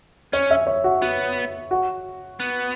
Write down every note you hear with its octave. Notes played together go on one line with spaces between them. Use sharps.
C#4 C#5
E5
C#5
F#4
B3 F#4
F#4
B3